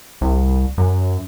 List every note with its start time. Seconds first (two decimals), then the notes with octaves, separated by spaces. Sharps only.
0.21 C2
0.77 F#2